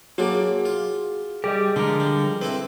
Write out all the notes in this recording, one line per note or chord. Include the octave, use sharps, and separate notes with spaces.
F#3 A#3 D4 F#4 G#4
F4
G3 G4 G#4 D#5
D3 F3 G#3 A#4
G3
C4 E4 A4 B4